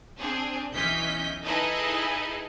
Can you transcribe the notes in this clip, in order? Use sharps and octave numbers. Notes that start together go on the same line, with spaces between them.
C4 D4 G#4
B1 E3 C#4 D#5 G6 B6
D#4 E4 G#4 A4 B4 D#5